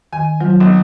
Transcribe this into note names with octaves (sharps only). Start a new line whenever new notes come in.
D#3 G#5
F3 F#3 C4
B1